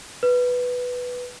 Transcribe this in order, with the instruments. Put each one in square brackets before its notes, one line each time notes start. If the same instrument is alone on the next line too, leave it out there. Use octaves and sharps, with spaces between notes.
[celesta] B4